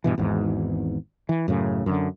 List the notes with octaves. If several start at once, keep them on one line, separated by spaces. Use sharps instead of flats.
G2 B2 E3
G#1 E2 G#2
E3
F#2 A2 C#3
F#2 D3